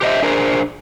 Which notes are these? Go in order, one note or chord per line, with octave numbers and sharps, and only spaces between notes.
G4 C5 D#5 E5
D4 G#4 A#4 C5